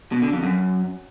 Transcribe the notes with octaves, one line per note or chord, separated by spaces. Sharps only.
B2
D3
F2
F#2